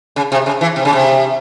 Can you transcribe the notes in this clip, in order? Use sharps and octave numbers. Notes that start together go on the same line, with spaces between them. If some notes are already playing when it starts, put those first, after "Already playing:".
C#3
C3
C#3
E3
C3
C#3
C3